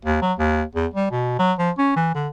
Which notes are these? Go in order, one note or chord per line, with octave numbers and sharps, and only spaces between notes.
D#2
F#3
D#2
E2
G3
B2
F#3
F3
C#4
E3
D3